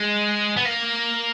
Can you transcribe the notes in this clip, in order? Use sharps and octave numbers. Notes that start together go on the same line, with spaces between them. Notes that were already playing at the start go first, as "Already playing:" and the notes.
Already playing: G#3
B3
A#3